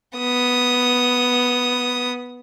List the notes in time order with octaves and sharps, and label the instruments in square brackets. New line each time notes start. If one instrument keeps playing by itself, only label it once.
[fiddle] B3 D#6